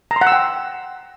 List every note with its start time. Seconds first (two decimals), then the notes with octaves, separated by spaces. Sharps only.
0.11 A#5
0.16 C6
0.21 F#5
0.27 E6
0.32 G5